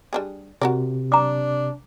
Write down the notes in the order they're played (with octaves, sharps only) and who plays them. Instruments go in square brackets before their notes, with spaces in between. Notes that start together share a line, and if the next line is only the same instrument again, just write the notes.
[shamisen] G3 D4 G#4
[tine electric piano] C3 [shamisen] F#4 A#4 D5
[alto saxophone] D4 [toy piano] A#5 D6